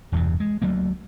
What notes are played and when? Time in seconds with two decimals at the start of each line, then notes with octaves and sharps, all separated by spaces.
0.12 E1 E2 G2 C3
0.40 G#3
0.62 D2 F#3 A3 A#3